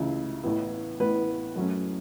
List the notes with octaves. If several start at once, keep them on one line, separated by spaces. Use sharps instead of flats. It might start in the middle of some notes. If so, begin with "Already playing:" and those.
Already playing: C#2 C#3 E3 E5
A1 A2 E3 B3
A1 A2 E3 B3 B4
F#2 F#3 A3 C#4